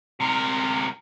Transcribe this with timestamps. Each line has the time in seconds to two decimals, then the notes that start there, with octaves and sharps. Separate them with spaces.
0.20 C3 A#4